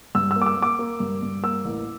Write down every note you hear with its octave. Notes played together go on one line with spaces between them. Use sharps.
G2 E6
E6
A#3
D6
E6
A#3
D6
A#3
G2
G2
A#3 E6
A1